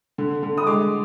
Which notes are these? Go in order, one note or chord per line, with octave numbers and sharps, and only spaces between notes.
D3
D3
D#6
G#3 D6